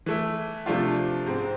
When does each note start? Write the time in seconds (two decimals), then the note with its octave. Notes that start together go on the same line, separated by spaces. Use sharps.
0.06 E3 A3 E4
0.66 C3 F3 A3 D4 F4
1.26 G#2 G#3 C4